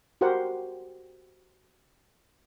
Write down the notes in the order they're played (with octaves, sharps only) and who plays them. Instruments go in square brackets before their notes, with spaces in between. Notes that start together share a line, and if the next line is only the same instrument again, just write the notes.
[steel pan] F#4 G4 A#4 C5 F#5